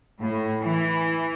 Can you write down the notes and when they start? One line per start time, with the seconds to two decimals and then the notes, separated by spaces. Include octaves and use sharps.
0.20 A2
0.61 E3